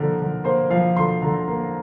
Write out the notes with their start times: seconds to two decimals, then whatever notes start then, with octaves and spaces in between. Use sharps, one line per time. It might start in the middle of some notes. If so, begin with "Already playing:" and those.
Already playing: D3 F3 A#3 A#4
0.19 D3
0.44 A#3 C5
0.70 F3 F5
0.96 D3 C6
1.22 D3 A#5
1.48 A#3